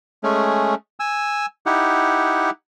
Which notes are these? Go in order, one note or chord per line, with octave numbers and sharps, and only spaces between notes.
G#3 A3 C#4
G#5 E6
D#4 E4 G4 F#5